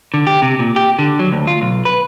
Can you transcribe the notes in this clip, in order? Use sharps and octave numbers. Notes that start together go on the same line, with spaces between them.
D3
G4
C3
A#2
G4
D3
F#3
D2
F4
B1
B4